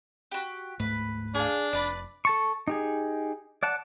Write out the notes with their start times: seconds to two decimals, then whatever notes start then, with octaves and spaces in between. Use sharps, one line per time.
0.31 F#4 G4
0.80 D1 G#2 A3 B4
1.35 D4 G#4 F5
1.73 F1 B4 D5
2.25 A4 A5 C#6
2.67 D#4 G4 G#4
3.63 D5 F#5 A5